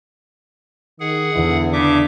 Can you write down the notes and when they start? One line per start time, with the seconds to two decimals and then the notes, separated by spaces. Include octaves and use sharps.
1.00 D#3 G#4 F#5
1.34 E2 D3 E3
1.72 C#3 D4 E5 D6